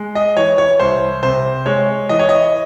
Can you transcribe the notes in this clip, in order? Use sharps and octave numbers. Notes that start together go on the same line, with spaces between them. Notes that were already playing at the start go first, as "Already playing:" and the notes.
Already playing: G#3
D#5
E3 C#5
C#5
C2 C5
C3 C5
G#3 C#5
E3 D#5
C#5
D#5